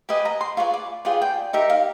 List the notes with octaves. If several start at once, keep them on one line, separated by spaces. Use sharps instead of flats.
G4 B4 D#5 G#5
A#5
C6
F4 G#4 B4 D5 C#6
D6
F4 G#4 B4 D5 G5
G5
D#4 G4 A#4 E5
F5